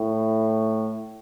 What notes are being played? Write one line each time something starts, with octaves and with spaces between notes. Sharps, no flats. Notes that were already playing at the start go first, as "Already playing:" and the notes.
Already playing: A2